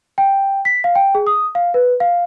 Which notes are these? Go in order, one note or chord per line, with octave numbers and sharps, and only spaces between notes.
G5
B6
F5
G5
G#4
D#6
F5
B4
F5